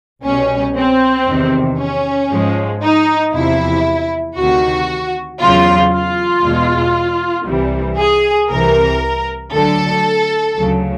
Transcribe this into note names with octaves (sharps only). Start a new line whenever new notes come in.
C2 B2 G3 C#4
C4
E2 C3 D#3
C#4
G#2 F3 G#3
D#4
E2 C3 F3 E4
D2 C3 D#3 F#4
E2 C#3 F#3 F4
F4
E2 B2 G#3
C2 C3 E3 G3
G#4
C2 C3 E3 A#4
D2 D3 F#3 A4
D2 C#3 F#3